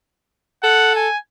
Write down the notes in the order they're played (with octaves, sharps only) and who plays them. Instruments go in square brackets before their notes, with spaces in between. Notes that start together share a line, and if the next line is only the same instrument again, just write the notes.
[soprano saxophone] A4 [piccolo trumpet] F#5
[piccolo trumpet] G#5